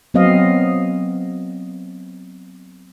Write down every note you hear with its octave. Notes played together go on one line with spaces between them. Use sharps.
F#3 B3 C4 D#5 F5